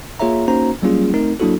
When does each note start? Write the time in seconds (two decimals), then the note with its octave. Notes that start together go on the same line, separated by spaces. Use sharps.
0.20 A#3 F4 G#4 C#5 E5 A#5
0.48 A#3 C#4 D#4 F#4 C5 A#5
0.82 F#3 G3 A#3 C#4 F4 G#4
1.14 A3 C4 D#4 A#4
1.40 F#3 A#3 D4 E4 F#4 A4